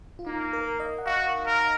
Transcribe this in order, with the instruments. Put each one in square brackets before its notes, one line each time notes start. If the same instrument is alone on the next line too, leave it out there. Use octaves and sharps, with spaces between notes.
[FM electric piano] F4
[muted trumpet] A#3 [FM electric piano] D#4
[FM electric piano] A#4
D#5
F#5
[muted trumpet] F#4 [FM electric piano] F5
[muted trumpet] A#4